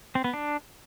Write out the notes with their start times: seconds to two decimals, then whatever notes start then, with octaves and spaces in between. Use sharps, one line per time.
0.15 C4
0.24 B3
0.33 D4